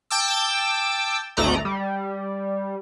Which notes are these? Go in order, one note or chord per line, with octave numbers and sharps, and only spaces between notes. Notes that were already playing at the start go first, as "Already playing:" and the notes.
G5 A5 D6 E6
G#1 D2 A3 D5 D#5 A#5
G3